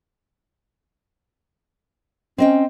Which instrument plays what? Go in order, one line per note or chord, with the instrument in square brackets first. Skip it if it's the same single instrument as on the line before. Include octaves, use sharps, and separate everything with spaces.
[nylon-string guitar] C4 D#5 G5 [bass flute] C#4